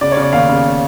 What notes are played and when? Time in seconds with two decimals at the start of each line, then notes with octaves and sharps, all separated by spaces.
0.01 C#3 D5
0.12 C#5
0.17 C#3 D5
0.33 D#2 F5
0.49 C#3